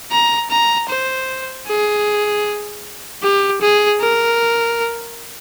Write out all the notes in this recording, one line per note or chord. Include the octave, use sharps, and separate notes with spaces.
A#5
A#5
C5
G#4
G4
G#4
A#4